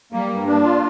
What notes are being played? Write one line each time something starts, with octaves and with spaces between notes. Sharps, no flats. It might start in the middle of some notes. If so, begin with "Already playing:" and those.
G3 A#3
G2
A#3 D4
F4